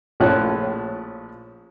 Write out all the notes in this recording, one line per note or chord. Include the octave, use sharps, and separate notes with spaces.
A#1 A2 F3 C#4 F#6